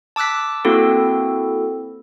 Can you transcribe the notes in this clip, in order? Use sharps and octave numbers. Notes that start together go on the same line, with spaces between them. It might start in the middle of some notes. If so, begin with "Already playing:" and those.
A5 D6 E6 F#6 B6
A#3 C4 E4 F#4 A4